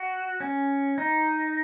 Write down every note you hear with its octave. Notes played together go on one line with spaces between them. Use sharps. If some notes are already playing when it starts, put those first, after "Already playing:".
Already playing: F#4
C#4
D#4